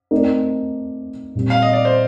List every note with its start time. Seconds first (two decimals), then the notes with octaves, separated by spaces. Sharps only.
0.11 A3 C4 D#4 A#4 D5
1.35 A#2 G3 C4
1.50 F5
1.62 D#5
1.73 D5
1.85 C5